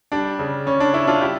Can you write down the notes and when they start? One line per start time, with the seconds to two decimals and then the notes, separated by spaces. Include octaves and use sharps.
0.12 G3 D4
0.39 C#3
0.66 C#3 C#4
0.80 D4
0.93 C#3 C#4 E4
1.07 D4 F4
1.21 G3 E4 G4